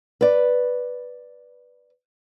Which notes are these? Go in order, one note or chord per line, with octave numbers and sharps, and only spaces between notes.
B4 D5